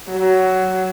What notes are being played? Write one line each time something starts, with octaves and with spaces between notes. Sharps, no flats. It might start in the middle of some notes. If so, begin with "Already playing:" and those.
F#3